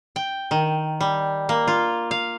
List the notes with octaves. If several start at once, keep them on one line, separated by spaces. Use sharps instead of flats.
G5
D#3
G3
A#3
F4
F5